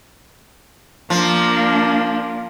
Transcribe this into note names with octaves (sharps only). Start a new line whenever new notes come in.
F3 A#3 D4